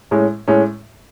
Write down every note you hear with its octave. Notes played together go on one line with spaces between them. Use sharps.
A2 G#3 C#4
A2 G#3 C#4